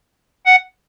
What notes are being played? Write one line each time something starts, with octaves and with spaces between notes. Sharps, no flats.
F#5